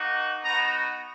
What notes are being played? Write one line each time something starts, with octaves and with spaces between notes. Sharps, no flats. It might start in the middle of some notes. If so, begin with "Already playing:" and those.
Already playing: A#3 D#4 F#4
B3 D#4 F#4 A#5